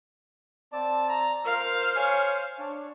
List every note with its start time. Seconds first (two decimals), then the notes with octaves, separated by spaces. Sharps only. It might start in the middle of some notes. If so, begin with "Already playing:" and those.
0.73 C4 D5 A5
1.09 A#5
1.45 F4 A#4 C5 F5
1.96 C#5 G#5
2.59 D4 C#5